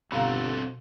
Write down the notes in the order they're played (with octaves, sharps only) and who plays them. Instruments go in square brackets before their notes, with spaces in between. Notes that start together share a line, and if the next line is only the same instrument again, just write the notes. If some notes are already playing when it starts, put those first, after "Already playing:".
[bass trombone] G1 [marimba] B2 F5 A#5 [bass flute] B3 [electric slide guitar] C4 F#4 A4